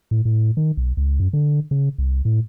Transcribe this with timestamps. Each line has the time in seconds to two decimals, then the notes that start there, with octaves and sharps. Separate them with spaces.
0.11 A2
0.25 A2
0.57 D#3
0.77 B1
0.97 C#2
1.20 F#2
1.33 D3
1.71 C#3
1.98 C2
2.25 A2